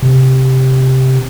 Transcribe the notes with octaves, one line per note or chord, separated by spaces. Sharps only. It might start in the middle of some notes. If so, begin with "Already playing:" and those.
C3